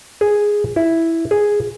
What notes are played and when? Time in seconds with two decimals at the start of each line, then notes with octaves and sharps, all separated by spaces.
0.21 G#4
0.76 E4
1.31 G#4